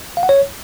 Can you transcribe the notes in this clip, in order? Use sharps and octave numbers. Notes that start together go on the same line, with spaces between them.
F5
F#5
C#5